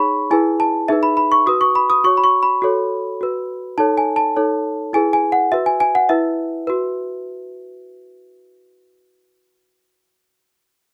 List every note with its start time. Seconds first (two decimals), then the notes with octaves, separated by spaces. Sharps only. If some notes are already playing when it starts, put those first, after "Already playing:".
Already playing: D#4 G#4 C#5 B5 C#6
0.31 E4 G#4 B4 G#5
0.60 A5
0.88 D#4 G#4 B4 E5
1.03 B5
1.17 B5
1.32 C#6
1.46 F#4 B4 D#6
1.61 C#6
1.75 B5
1.90 D#6
2.04 F#4 C#5 C#6
2.17 B5
2.24 C#6
2.43 B5
2.62 F#4 A4 C#5
3.21 F#4 B4
3.78 D#4 A4 C#5 A5
3.97 G#5
4.16 A5
4.36 D#4 A4 C#5
4.93 E4 G#4 B4 G#5
5.13 G#5
5.32 F#5
5.52 F#4 B4 E5
5.66 G#5
5.80 G#5
5.95 F#5
6.09 E4 B4 E5
6.67 F#4 B4